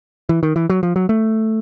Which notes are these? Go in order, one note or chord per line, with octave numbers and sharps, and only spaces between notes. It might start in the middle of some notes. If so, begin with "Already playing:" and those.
E3
D#3
E3
F#3
F3
F#3
A3